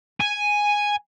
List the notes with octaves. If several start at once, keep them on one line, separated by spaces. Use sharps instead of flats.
G#5